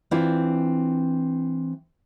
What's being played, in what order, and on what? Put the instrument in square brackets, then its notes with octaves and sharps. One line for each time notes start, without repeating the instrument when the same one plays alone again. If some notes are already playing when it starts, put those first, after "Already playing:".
[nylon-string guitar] E3 C4 D4 E4 F4